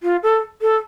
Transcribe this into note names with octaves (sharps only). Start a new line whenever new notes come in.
F4
A4
A4